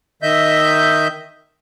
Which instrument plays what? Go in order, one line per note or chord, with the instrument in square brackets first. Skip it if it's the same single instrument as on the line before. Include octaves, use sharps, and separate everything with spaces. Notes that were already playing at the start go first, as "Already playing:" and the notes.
[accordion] D#3 D#5 E5 G6